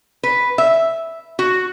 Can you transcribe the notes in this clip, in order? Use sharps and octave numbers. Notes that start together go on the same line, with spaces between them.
B4
E5
F#4